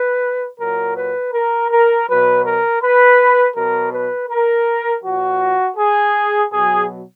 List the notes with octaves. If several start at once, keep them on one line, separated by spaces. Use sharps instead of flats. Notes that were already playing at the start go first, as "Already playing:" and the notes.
Already playing: B4
A#2 F#3 A#4
B4
A#4
A#4
B2 F#3 B4
A#4
B4
B2 F#3 A#4
B4
A#4
A#2 F3 F#4
G#4
B2 F#3 G#4